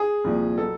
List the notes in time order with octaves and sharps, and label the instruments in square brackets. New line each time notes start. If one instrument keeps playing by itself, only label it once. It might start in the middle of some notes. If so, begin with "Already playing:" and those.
Already playing: [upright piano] G#4
C2 A#2 F3
B2 F#3 A4